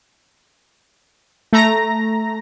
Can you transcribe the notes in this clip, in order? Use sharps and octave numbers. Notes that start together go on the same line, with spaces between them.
A3 A#5 A#6